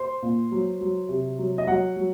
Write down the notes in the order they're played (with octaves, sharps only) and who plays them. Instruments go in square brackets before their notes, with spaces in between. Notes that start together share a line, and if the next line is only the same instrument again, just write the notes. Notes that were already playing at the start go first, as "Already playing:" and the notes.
Already playing: [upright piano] C5
A#2
F#3
F#3
C3
F#3
D#5
F#3 F#5
F#3